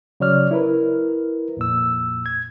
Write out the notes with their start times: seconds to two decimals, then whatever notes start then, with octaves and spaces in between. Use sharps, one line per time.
0.20 C#3 F#3 C#5 D5 F6
0.51 E4 A#4 B4
1.57 F2 A#2 E6
2.26 G#6